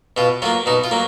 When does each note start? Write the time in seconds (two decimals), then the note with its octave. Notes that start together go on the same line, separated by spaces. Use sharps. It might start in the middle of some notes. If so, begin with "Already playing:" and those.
0.17 B2 F4
0.42 F#3 F4
0.45 A#3
0.66 B2 D#4
0.84 F4
0.91 F#3 A#3